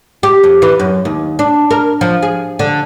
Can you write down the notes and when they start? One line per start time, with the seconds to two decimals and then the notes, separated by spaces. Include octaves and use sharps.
0.23 G4
0.43 F2
0.62 E3
0.80 F#2
1.05 D#2
1.39 D4
1.71 A#4
2.01 F3
2.22 G#4
2.59 D3